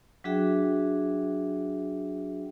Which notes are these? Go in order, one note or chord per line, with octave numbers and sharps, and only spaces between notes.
F#3 D4 F#4 G#4 E5 G5